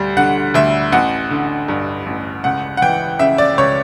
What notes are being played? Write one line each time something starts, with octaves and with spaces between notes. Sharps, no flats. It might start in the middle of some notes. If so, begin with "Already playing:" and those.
Already playing: D2 G3
D3 F#5
D2 E5
A1 F#5
D3
G2
A1
C#2 F#5
F#5
E3 G5
C#3 E5
D5
C#2 C#5